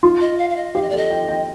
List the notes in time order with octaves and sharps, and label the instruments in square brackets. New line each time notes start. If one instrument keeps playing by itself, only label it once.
[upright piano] F4
[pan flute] D#5
F5
F5
D#5
[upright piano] G4 [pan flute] F5
[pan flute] D#5
D5
[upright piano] A4
[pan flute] D#5
[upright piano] G5
G5